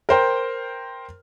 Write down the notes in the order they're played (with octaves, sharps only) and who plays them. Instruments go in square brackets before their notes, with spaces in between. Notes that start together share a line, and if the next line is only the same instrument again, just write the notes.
[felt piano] A#4 C5 G5